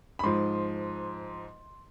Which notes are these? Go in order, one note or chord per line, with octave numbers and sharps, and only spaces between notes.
B5
G#2 F3 C6